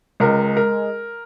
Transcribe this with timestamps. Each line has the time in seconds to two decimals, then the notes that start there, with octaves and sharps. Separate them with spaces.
0.20 C#2 G#3 A#4
0.57 A#4